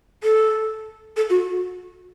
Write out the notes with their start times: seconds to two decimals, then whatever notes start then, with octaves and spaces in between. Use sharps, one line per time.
0.23 A4
1.17 A4
1.30 F#4